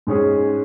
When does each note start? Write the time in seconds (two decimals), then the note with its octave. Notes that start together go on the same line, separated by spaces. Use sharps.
0.07 G#2 G#3 C#4 G#4